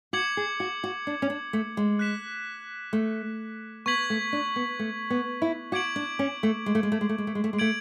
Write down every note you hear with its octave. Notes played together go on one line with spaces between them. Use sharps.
F#4 D6 G#6 C#7 F#7
G#4
F#4
F#4
D4
C#4
D4
A3
G#3
F#6 B6 E7
A3
B3 C#6 G#6 B6 F#7
A3
D4
B3
A3
B3
E4
F#4 D6 G#6 D7 F#7
D4
C#4
A3
G#3
A3
G#3
A3
G#3
A3
G#3
A3
G#3
A3
G#3
A3 G#6 D7 F#7